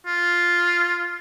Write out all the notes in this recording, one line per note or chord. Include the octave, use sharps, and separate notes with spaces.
F4